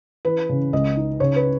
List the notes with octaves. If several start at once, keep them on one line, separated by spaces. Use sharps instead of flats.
E3 B4
C#3
C#2 D#5
D#4
C#3 C#5
B4